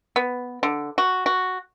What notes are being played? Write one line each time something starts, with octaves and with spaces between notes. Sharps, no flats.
B3
D3
F#4
F#4